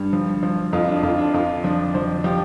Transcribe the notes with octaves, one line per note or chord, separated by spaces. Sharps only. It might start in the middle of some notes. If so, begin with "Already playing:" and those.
Already playing: G2
F3
F3
F2 F4
D4
F2 F4
D4
F2 F4
F3 D4
F3 C5
F3 G4